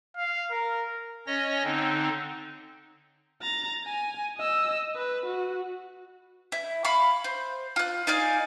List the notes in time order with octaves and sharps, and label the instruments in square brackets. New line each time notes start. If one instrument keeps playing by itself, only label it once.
[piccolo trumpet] F5
A#4
[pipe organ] C#4 C#5 D#5 A#6
D3 C4 D#4
[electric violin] A#5 A6
G#5
D#5 E6
B4
F#4
[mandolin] E4
F5 B5 C#6
C5
F4 F#6
D#4 D5 F5 G#5